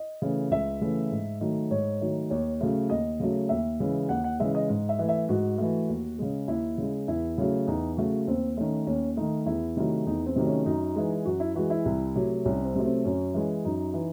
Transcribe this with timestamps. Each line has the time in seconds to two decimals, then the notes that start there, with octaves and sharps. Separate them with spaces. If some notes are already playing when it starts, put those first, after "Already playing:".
Already playing: D#5
0.22 C#3 E3 A3
0.51 C#2 E5
0.81 C#3 E3 A3
1.11 G#2
1.41 D#3 F#3 A3
1.71 G#2 C#5
2.01 D#3 F#3 A3
2.30 D#2 C#5
2.61 C#3 F#3 A3
2.90 D#2 D#5
3.20 C#3 F#3 A3
3.49 D#2 E5
3.80 C#3 E3 G#3
4.09 D#2 F#5
4.24 F#5
4.40 C#3 E3 G#3 E5
4.55 D#5
4.69 G#2
4.89 E5
4.99 E3 A3
5.09 E5
5.29 G#2 F#4
5.58 E3 A3
5.89 D#2
6.19 C#3 G#3
6.48 D#2 E4
6.78 C#3 G#3
7.08 E2 E4
7.38 C#3 F#3 A3
7.67 E2 D#4
7.97 C#3 F#3 A3 F#4
8.27 D#2 C4
8.57 D#3 A3 C#4
8.87 D#2 C#4
9.17 D#3 A3 D#4
9.46 E2 E4
9.77 C3 D#3 F#3 A3
10.06 E2 D#4
10.26 C4
10.36 C3 D#3 F#3 A3
10.46 C#4
10.66 F#2 D#4
10.96 E3 G#3
11.25 F#2 F#4
11.40 E4
11.55 E3 G#3 F#4
11.70 E4
11.86 C2
12.15 C3 F#3 A3
12.45 C2 C#4
12.65 C4
12.75 C3 F#3 A3
12.85 C4
13.04 F#2 C#4
13.34 E3 G#3
13.65 F#2 D#4
13.94 E3